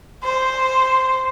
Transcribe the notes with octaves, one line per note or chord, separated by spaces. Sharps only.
C5